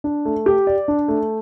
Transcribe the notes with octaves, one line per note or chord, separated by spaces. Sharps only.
D4
A3
G4
D5
D4
A3